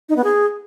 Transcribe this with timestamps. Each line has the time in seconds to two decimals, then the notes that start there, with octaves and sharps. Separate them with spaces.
0.09 D#4
0.17 B3
0.24 G#4